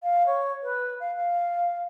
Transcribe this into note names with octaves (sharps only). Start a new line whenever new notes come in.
F5
C#5
B4
F5
F5